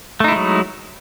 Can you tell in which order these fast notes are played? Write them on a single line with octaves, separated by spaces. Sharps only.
A3 D#4 E4 G#3 F#3